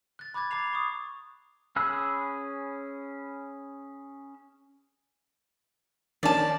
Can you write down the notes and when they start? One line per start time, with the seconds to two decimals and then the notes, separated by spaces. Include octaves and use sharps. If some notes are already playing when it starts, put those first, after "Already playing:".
0.19 F#6 A6
0.34 B5 D6 F#6 G#6 A6
0.51 A#5 D6 A6 C7 F7
0.73 C#6 D#6
1.76 C#4 G#4 B5 E6 F#6
6.23 D#3 C#4 D4 D5 A5